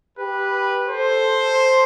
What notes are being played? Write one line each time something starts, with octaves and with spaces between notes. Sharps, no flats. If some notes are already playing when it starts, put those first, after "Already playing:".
G4 B4
A4 C5